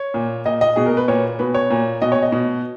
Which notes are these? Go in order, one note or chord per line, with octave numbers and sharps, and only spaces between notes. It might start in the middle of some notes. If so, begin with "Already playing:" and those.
Already playing: C#5
A#2
A#2 D#5
D#5
B2 G#4
A#4
B4
A#2 C#5
B2 B4
C#5
A#2
B2 D#5
C#5
D#5
B2